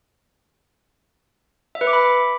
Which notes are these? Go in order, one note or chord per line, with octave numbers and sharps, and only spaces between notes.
E5
B4
D6
B5